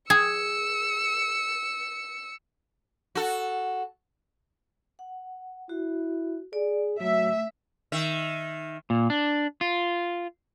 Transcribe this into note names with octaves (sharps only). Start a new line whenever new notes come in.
G#4 E6 C#7
F#4 A4
F#5
E4 F#4
G#4 D5
F#3 A3 E5
D#3 E5
A#2
D4
F4